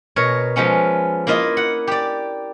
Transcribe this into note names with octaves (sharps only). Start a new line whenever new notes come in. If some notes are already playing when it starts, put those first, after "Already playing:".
B2 A#4 C#5
F3 G#3 B3 C#4
A#3 E4 F4 D#5
F#5
G4 D5